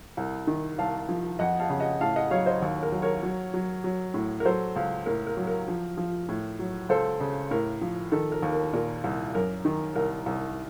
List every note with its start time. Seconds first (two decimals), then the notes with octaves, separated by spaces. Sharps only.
0.17 C2
0.47 D#3
0.78 C2 F5 A5
1.09 F3
1.39 F2 D#5 F#5
1.60 F5 A5
1.70 C#3
1.80 D#5 F#5
2.01 A2 F5 A5
2.16 D#5 F#5
2.31 F#3 C#5 F5
2.46 C5 D#5
2.62 D#2
2.83 A#4
2.92 F#3
3.02 A#4 C#5
3.23 F#3
3.54 F#3
3.84 F#3
4.14 A2
4.40 A#4
4.45 F#3 A4 C5
4.76 C#2
5.06 A2 A#4
5.27 A#4
5.37 F#3
5.47 A#4
5.68 F3
5.97 F3
6.29 A2
6.59 F#3
6.89 C#2 A4 C5
7.20 C#3
7.51 A2 A#4
7.81 F3
8.12 D#3 A4
8.32 A#4
8.42 D#2
8.52 A#4
8.73 A#2 A#4
9.04 C2
9.35 F#2 A#4
9.65 D#3
9.95 C2 A#4
10.26 C2